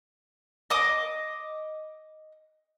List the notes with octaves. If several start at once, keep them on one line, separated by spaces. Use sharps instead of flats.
D#5 D6 D#6